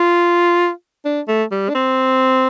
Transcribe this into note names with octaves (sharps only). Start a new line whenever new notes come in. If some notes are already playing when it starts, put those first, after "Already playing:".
Already playing: F4
D4
A3
G3
D4
C4